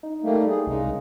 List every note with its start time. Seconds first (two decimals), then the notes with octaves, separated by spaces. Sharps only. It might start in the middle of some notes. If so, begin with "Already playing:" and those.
0.03 D#4
0.23 G3 A3 A#3
0.49 G#4
0.67 C2 C#3 G#3 D#4